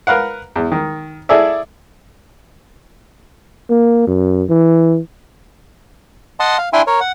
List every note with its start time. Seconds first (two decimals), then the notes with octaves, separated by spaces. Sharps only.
0.07 A#4 B4 F5 F#5
0.56 E2
0.72 D#3
1.29 E4 G#4 A4 D5 E5
3.70 A#3
4.07 F#2
4.49 E3
6.40 D#5 F#5 A5 C6
6.58 F5
6.73 D4 E4 E5 G5 G#5 C6
6.87 A#4 C#5
7.00 F#5